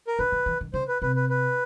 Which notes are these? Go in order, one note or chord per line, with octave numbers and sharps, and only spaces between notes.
A#4
D3 B4
D#3
E3
D#3
C#3 C5
B4
C3 B4
B4
B4